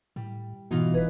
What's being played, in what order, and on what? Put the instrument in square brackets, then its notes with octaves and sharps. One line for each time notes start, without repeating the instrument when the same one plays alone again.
[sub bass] A2 [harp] G3
[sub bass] G#2 [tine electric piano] B2 [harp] E3 D#4 F4
[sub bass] G1 [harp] G#4 B6 [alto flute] B4